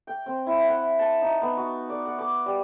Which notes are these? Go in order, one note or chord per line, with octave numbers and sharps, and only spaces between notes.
G5
C4
E4
F#5
A5
D#4
B3
F#4
D5
F#5
D6
G3